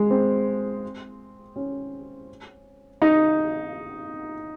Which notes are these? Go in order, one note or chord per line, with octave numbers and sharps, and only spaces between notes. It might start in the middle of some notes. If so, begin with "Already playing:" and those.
Already playing: G#3
C4
C#4
D#4